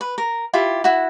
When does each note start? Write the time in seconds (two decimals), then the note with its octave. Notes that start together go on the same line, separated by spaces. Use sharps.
0.01 B4
0.18 A#4
0.53 E4 F4 G4
0.84 E4 F#4